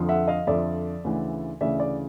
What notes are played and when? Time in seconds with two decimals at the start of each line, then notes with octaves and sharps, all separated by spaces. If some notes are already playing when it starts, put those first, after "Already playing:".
Already playing: F2 D3 F3
0.09 E5 F#5
0.28 D#5 F5
0.47 F2 D3 F3 D5 E5
1.04 D2 C#3 E3
1.61 D2 C#3 E3 D5 E5
1.80 D5